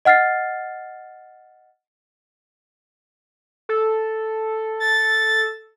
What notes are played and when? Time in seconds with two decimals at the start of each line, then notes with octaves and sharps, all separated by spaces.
0.05 D#5 F#5 F6 A6 C7
3.69 A4
4.80 A6